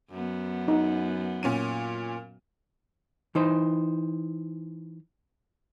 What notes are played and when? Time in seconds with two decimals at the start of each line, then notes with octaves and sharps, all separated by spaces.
0.11 F#2 B3
0.68 D#4
1.43 A#2 C#4 D#7
3.35 E3 D#4 C5